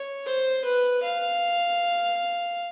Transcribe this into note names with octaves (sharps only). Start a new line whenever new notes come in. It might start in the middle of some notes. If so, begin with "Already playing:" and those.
Already playing: C#5
C5
B4
F5